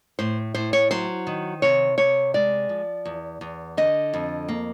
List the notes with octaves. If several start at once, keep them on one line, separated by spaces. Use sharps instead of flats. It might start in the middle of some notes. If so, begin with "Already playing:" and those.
A2 C5
A2 C5
C#5
F#3 C5
D#3
C3 C#5
C3 C#5
G#3 D5
F3
E2
E2
D3 D#5
F2
A#3